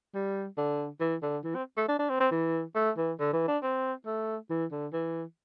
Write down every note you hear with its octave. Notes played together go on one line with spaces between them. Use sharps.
G3
D3
E3
D3
E3
C4
A3
D4
D4
C4
C4
E3
A3
E3
D3
E3
D4
C4
A3
E3
D3
E3